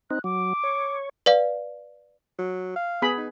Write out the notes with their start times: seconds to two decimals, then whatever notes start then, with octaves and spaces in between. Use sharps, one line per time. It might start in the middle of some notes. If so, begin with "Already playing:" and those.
0.11 C4 D#4 F#6
0.24 F#3 D6
0.64 C#5
1.26 B4 D5 F5
2.39 F#3
2.76 F5
3.02 B3 G#4 B5
3.18 D#4